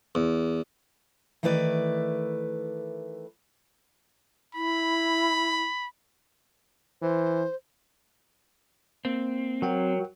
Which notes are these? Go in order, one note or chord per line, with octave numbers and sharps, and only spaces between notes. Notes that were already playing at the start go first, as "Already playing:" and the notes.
E2
D#3 E3 A3 E4 B4 D5
E4 B5
E3 C5
A#3 C4
F#3 A#4 F#5 G5